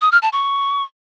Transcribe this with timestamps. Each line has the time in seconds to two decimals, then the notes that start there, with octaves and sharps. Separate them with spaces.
0.01 D#6
0.12 F6
0.22 A5
0.33 C#6